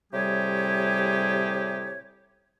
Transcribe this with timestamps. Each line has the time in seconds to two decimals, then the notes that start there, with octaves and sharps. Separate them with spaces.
0.12 A2 C3 G3 G4 G#4 C#5